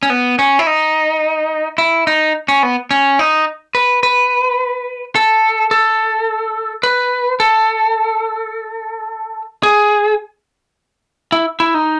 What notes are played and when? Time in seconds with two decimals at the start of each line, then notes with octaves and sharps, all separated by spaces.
0.03 C#4
0.10 B3
0.39 C#4
0.59 E4
0.67 D#4
1.78 E4
2.07 D#4
2.48 C#4
2.63 B3
2.91 C#4
3.19 D#4
3.75 B4
4.03 B4
5.15 A4
5.71 A4
6.83 B4
7.40 A4
9.63 G#4
11.32 E4
11.60 E4
11.74 D#4